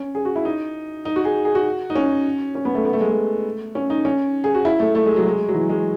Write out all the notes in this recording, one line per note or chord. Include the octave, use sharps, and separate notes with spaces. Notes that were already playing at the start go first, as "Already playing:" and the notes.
Already playing: C#4
G#4
F#4
E4
D#4
D#4
F#4
G#4
G#4
F#4
D#4
C#4
C#4
B3
A3
B3
A3
G#3
A3
C#4
D#4
C#4
G#4
F#4
E4
A3
A3
G#3
F#3
G#3
F#3
E3
G#3